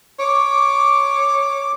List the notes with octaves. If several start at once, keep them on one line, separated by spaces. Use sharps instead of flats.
C#5 D6